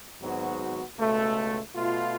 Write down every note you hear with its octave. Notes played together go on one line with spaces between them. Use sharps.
G#1 G#2 F#3 B3 F#4
C#2 B2 A3
B2 A3 F4